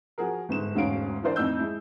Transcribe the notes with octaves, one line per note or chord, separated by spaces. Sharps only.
F3 F#4 G#4 A#4
G1 G#2 E7
E1 D2 G#2 C#4 F5 D7
E3 D4 F4 A#4 C5 D5
F2 A2 D#4 E6 G6
G#3 E4